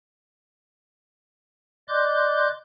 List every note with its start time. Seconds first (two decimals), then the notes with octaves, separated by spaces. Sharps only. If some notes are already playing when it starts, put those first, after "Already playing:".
1.88 D5 D#5 C6 D6 F#6 G6